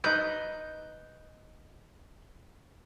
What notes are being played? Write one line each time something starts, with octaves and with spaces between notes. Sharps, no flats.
D#4 B4 G6